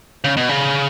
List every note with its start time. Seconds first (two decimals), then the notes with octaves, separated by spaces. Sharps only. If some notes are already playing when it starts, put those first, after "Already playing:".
0.24 C#3
0.37 B2
0.49 C#3